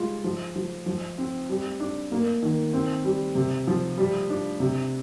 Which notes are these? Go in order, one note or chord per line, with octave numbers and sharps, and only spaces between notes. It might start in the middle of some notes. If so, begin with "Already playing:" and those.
Already playing: G3 G#3 F4
F3
F3
F3
C4
G3
D4
A#3
D#3
C4
G3
C3
F3
G3
D4
C3